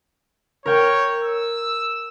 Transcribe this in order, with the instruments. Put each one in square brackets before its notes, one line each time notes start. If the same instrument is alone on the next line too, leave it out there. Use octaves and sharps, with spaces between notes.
[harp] A#4 G5 [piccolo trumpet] C#5
[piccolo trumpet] E6